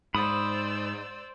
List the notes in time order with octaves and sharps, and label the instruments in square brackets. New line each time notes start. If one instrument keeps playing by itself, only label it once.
[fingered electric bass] G#2 [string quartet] C5 D5 E6 [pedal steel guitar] B5 D#6